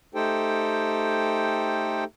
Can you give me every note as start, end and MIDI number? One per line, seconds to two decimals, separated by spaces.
0.15 2.04 57
0.15 2.04 63
0.15 2.04 67
0.15 2.04 69
0.15 2.04 72
0.15 2.04 79